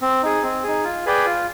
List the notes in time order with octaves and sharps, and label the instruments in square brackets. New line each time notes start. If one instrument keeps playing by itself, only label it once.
[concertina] C4
D#4 G#4
C4
D#4 G#4
F4
G#4 B4 D5 G5
F4